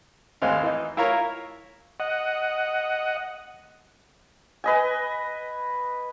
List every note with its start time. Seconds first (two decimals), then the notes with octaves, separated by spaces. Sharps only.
0.42 G#1 D#2 G#3 C4 F5
0.63 E3 D#4
0.97 E4 F4 A#4 C#5 A#5
2.00 D#5 F#5
4.64 B4 D#5 G#5